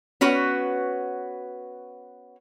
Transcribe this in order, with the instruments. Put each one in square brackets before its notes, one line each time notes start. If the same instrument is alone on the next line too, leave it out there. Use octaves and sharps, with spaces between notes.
[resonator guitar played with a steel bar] B3 C#4 F#4 B4